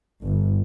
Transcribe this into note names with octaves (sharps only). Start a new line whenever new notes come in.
G1